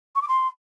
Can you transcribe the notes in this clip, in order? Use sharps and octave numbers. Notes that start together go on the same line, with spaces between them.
C#6
D6
C6